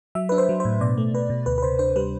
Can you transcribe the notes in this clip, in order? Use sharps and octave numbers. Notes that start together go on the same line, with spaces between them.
F#3 E5
D4 B4
C5
F#3
A2 C5
B2 D5
A3
B2 B4
B2
D2 B4
B4
C3 C5
D4 C5
G3 B4